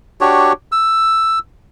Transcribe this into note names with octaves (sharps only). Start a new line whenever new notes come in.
D4 F#4 G4 C#5
E6